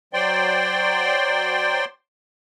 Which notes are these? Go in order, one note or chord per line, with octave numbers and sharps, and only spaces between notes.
F#3 C5 D5 G5 C6